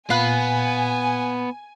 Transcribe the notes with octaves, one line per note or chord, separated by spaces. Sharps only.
A#2 B3 F5 G#5 B5 F#6